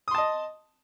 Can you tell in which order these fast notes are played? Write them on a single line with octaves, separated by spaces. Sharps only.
D#6 C6 A5 D#5